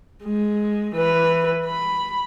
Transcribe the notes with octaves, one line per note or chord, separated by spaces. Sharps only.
G#3
E3 B4
B5